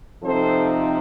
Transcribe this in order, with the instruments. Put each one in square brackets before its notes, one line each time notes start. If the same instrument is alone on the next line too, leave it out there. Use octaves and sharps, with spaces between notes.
[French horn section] C3 F3 C4 D#4 A4 C5